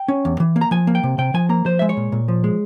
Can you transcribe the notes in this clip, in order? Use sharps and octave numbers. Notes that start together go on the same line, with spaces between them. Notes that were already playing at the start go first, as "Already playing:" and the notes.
Already playing: G5
C#4
E2
E3
A#3
A#5
F3 G#5
A#3
G5
C3
C3 G5
F3 G#5
A#3 A#5
F3 C5
G#3 E5
C#5
A#2
A#2
F3
G#3